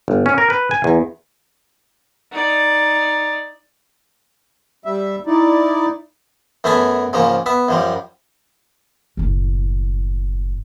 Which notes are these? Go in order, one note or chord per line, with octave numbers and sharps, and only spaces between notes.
G1
C#4
A#4
B4
G#5
E2
D#4 D5
G3 E5
D#4 E4 D5
F#2 A3 B3 E5 G#5
G#2 C#3 F3 A#3
B3 E5
F#2 F3 G3
F#1 A2